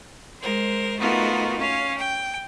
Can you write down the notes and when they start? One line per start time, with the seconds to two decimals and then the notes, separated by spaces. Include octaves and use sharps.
0.40 G#3 A#4 C5
0.98 A3 B3 D#4 F4 F#4 A#4
1.57 C#4 F5
1.97 G5